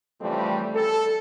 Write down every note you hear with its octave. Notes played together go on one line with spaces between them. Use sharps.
C#3 E3 F3 G3 A3 C4
A4